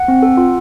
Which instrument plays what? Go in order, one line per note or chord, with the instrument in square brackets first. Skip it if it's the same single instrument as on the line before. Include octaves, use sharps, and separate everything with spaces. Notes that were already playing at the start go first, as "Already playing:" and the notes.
Already playing: [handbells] F#5
C4
A4
F4